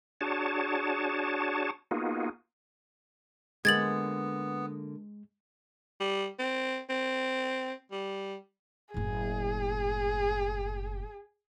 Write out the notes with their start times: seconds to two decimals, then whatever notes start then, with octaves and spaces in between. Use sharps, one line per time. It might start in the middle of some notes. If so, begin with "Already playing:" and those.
0.21 D4 F#4 G#4 C#5 A5
1.91 A#3 B3 D#4 F4 F#4 G#4
3.65 D3 G#3 A#3 B3 G#6 A6 F#7
6.00 G3
6.39 C4
6.89 C4
7.91 G3
8.94 F#1 A2 G#4